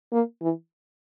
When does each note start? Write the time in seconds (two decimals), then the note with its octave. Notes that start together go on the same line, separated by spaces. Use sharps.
0.13 A#3
0.42 E3